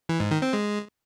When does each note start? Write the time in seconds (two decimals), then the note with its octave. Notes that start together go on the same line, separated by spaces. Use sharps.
0.09 E3
0.20 G#2
0.31 D#3
0.42 C4
0.53 G#3